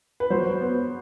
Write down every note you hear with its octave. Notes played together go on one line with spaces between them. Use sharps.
B4
F#3 C5
B3